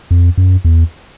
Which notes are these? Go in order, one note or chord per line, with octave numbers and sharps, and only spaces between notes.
F2
F#2
E2